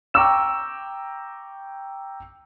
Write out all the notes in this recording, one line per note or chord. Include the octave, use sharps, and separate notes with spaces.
G5 A#5 C#6 D6 E6 E7